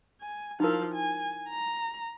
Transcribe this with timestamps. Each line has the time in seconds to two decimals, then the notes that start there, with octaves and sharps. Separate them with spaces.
0.21 G#5
0.60 F3 D#4 E4 A#4 F5
0.94 G#5
1.49 A#5